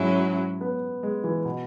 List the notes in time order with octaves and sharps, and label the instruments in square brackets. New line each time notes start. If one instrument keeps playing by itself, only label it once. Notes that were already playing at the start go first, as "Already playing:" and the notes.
Already playing: [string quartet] G#2 F#3 C#4 E4 [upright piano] G#3
[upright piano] B3
G#3
E3
B2